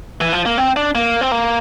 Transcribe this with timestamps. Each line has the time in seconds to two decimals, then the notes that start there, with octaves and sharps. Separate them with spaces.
0.21 E3
0.33 F3
0.46 A#3
0.58 C4
0.76 D4
0.95 A#3
1.21 C4
1.32 A#3